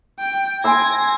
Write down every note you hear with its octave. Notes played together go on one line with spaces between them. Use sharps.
G5
G#5 C6 E6 G#6 A#6